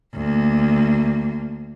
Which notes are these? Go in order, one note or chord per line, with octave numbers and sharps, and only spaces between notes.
D2 A#3